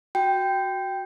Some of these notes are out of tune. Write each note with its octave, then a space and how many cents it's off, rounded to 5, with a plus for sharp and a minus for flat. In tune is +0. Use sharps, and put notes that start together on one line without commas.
F#4 +0 G5 +0